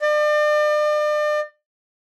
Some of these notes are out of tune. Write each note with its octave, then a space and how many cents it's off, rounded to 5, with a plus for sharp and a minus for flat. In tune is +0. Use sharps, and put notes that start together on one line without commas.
D5 +40